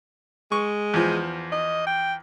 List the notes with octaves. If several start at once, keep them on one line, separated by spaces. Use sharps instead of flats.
G#3 C#6
E2 F3
D#5
G5